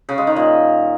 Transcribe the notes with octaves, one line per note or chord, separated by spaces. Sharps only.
C#3
G#3
D#3
A#2